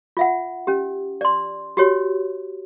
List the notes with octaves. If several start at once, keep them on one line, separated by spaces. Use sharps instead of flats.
F4 E5 F#5
C#4 G4
D5 C6
F#4 G4 C#5